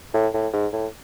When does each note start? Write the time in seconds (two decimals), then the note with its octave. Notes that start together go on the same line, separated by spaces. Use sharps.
0.14 A2
0.34 A2
0.53 G#2
0.72 A2